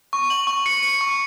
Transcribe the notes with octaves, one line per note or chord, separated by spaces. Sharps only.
C#6
F#7
C#6
C#7
C#7
C#6